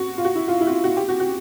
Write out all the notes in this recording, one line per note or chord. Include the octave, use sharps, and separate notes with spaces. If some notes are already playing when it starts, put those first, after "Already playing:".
Already playing: F#4
F4
F#4
E4
F4
E4
F#4
F4
F#4
G4
F#4
F#4